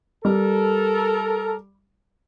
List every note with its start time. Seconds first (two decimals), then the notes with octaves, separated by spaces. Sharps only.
0.25 G3 A4 A#4